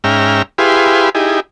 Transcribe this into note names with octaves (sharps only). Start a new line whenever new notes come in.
G#2 C#4 E5 G5 A#5 F6
E4 G4 G#4 B4 F5 C6
D#4 E4 G4 G#4